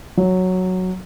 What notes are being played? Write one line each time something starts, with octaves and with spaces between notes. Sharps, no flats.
F#3